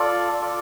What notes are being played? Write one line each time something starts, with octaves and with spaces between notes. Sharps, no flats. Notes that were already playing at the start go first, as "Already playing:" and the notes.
Already playing: F4 A4 D5
F4 A4 D5